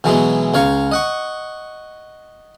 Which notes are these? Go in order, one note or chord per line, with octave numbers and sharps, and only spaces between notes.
B2 E3 F#3 G#3 B3
C#2 C#5 F5 A#5 C#6
D#5 F#5 C#6